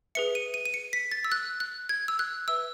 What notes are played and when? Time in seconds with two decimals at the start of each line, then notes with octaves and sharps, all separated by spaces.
0.15 G#4 B4 E5 C#7
0.35 D#7
0.54 D#7
0.65 D#7
0.74 C#7
0.93 B6
1.12 A6
1.24 E6
1.32 F#6
1.60 F#6
1.89 G#6
2.08 E6
2.19 F#6
2.48 B4 E5 E6